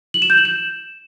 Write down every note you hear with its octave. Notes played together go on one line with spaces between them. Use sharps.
F#7
E7
G6
F#7
E7